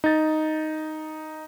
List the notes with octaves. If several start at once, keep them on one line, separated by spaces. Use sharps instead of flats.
D#4 A6